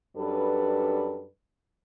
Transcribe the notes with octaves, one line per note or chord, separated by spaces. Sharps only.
F#2 G3 D4 A4 B4